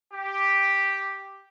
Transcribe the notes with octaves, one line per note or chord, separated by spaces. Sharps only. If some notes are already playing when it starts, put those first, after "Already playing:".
G4